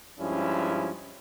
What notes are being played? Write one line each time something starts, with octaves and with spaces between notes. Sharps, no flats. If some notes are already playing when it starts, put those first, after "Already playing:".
G2 F3 G#3 C#4 E4